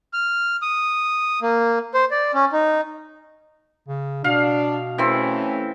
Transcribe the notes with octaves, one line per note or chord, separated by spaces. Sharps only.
F6
D#6
A#3
C5
D5
C#4
D#4
C#3
B2 D4 F5
E3 A3 C4 C#4